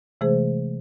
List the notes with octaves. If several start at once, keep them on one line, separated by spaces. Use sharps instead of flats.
C3 E3 G#3 A3 G#4 C5